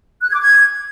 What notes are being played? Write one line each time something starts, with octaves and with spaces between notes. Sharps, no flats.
F#6
G#6
D6
G#6